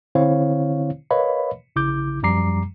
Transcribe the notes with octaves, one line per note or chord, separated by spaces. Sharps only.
D3 C4 E4 C5 C#5 F5
A#4 B4 C#5 D#5 F5 B5
A#1 C#3 E4 D6 G6
F#2 F3 G3 A#5 D6 C7